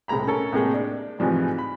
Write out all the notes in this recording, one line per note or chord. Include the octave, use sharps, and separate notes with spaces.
C2 A2 G#3 A#5 B5
C#4 A4 A#4
A2 C3 G#3 A#3 G#4
D4
G#2 C3 E3 F3 G3
B5